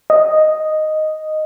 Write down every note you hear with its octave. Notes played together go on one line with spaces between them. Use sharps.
D#5